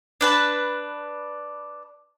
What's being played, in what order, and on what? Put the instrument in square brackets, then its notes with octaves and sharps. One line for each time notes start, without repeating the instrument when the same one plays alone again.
[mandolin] D4 B4 A5